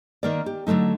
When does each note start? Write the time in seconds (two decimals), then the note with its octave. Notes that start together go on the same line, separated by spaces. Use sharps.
0.23 D#3 A#3 D5
0.46 G4
0.67 D3 F#3 G#3 A3 D#4